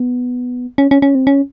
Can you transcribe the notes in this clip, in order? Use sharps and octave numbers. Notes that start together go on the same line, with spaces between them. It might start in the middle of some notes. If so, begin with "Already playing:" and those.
Already playing: B3
C#4
C#4
C#4
C4
C#4